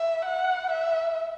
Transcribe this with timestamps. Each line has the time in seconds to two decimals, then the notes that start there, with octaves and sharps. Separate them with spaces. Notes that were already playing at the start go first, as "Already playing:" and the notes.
Already playing: E5
0.25 F#5
0.70 E5